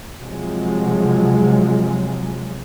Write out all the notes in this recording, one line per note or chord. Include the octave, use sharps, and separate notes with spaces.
C3 F3 F#3 G#3